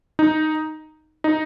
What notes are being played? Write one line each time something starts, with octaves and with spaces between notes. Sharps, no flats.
D#4
D#4